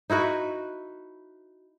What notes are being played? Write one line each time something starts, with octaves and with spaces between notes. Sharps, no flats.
D#4 E4 F#4 B4